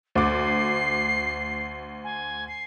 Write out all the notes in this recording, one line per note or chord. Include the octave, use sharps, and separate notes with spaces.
D2 D6 C7
G#5
C7